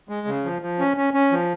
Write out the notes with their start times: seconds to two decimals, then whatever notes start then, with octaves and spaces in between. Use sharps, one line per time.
0.09 G#3
0.27 C#3
0.45 F3
0.62 F3
0.79 C#4
0.97 C#4
1.14 C#4
1.32 F3